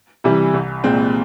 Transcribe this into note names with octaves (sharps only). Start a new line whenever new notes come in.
C3 E3 G3
C2
A#2 G#3 C4